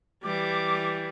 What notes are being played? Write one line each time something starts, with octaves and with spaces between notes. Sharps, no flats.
E3 G3 D6